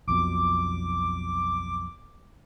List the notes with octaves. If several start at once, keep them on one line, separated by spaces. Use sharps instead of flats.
B1 F2 B2 D6